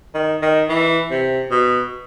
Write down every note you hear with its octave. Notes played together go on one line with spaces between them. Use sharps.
D#3
D#3
E3
C3
B2